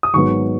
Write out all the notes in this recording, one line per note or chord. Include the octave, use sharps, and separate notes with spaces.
D#6
G#1 G#2 D#3 F#3 B3 C#6